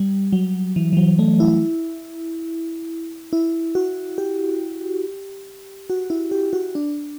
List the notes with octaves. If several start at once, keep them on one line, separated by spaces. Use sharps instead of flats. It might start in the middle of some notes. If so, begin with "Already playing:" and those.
Already playing: G3
F#3
E3
E3
F#3
A3
E4
E4
F#4
G4
F#4
E4
G4
F#4
D4